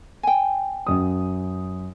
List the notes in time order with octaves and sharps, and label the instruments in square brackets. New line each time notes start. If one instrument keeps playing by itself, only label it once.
[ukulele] G5 G#5
[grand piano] F#2 D#6